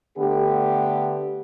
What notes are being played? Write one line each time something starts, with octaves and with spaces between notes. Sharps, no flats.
D3 A3 B3 G4